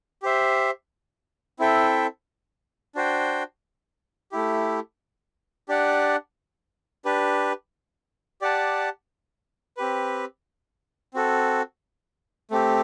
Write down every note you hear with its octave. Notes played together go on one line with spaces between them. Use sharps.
G4 C5 E5
C4 E4 A4 E5 G5
D4 F#4 C5 G5
A3 E4 G4
D4 G4 D5 F#5
D4 G4 B4
G4 D5 F#5 A5
C4 G4 B4
C4 F#4 A4
A3 C4 G4